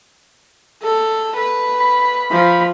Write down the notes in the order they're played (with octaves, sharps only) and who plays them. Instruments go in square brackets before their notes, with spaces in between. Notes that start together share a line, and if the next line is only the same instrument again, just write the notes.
[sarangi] A4
B4
[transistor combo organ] B5
[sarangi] F3